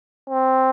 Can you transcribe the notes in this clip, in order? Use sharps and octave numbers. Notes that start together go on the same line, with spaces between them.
C4